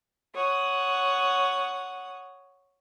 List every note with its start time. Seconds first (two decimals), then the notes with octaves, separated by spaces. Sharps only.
0.34 C#5 F#5 D#6